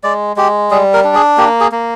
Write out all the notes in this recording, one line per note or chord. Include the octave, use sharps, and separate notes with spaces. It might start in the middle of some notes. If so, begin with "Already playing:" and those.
G#3 D5
G#3 G4
G3 G#4
A#4
D4
G#4
A#3 G4
G#4
A#3